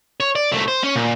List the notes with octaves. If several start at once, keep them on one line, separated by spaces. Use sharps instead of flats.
C#5
D5
C2 A3
C5
C#4
A#2